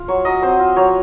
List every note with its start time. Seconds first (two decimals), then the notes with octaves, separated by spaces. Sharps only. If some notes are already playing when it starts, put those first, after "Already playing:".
Already playing: F4
0.08 F#3 C#5
0.25 F#3 D#5
0.42 C4 C5
0.59 F4
0.76 F#3 C#5